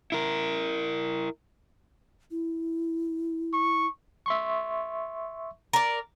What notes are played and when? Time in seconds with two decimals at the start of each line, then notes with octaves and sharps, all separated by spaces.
0.12 E4 A#4
2.31 E4
3.53 C#6
4.26 E5 C6 C#6
5.73 A#4 D5